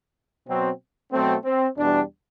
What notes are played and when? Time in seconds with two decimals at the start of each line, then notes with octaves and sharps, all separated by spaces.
0.47 B2 F#3 C4
1.12 B2 F#3 A3 C4
1.45 C4
1.78 E2 B2 G3 D4